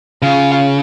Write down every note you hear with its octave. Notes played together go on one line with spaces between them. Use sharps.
C#3 F4